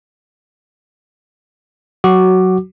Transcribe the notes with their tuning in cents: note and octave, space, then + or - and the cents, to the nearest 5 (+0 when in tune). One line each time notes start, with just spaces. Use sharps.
F#3 +0 F#4 +10 D6 +15